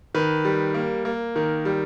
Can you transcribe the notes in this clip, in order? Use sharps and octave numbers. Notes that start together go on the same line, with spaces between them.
D#3 B4
G3
A#3
A#3
D#3
G3